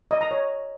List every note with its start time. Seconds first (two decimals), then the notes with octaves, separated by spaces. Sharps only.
0.11 D#5
0.21 A#5
0.31 C#5